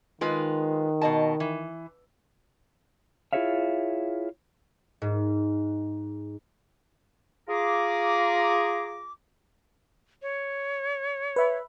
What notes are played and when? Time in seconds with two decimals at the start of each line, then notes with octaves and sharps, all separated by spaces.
0.21 D#3 G#3 F4 B4
1.01 B2 D#5 A5
1.40 E3
3.33 E4 F4 G#4 C#5 E5 F5
5.02 G#2
7.49 F4 G#4 A#5 D6
10.22 C#5
11.36 B4 E5 B5